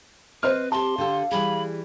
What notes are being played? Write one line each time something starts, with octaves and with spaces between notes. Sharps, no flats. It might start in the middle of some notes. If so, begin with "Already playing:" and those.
C4 B4 C5 D#5 F6
G4 A5 C6
D3 G4 A4 F5
E3 G3 G#4 B5